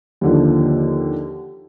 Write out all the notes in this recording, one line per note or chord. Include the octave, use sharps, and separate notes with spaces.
D#2 D3 F3